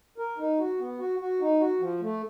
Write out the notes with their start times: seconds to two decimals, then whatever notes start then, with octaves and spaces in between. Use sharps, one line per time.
0.18 A#4
0.38 D#4
0.59 F#4
0.79 B3
0.99 F#4
1.20 F#4
1.41 D#4
1.60 F#4
1.81 F3
2.01 A3